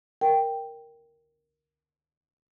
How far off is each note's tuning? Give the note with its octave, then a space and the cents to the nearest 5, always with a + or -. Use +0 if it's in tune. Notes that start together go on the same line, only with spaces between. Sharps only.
A#4 +0 G5 +0